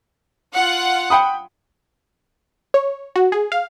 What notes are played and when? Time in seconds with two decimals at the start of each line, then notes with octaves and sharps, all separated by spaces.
0.54 F4 F#5
1.10 G5 B5 D#6
2.74 C#5
3.16 F#4
3.32 G#4
3.52 F5